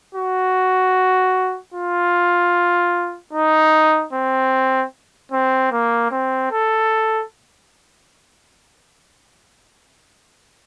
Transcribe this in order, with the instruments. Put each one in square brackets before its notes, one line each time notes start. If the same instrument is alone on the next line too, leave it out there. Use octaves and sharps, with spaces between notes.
[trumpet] F#4
F4
D#4
C4
C4
A#3
C4
A4